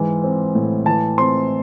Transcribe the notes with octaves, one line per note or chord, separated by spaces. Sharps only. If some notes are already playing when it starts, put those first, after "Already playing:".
Already playing: G#2 E3
C4
A2
E3 A5
C4 C6